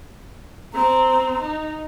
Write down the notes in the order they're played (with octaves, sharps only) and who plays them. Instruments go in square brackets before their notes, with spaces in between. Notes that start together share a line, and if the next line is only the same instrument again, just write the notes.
[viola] C4 [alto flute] A#5
[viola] D#4